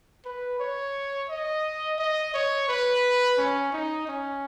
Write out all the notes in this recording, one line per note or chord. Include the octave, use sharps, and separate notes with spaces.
B4
C#5
D#5
D#5
C#5
B4
C#4
D#4
C#4